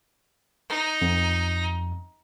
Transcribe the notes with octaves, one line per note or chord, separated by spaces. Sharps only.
D#4
F2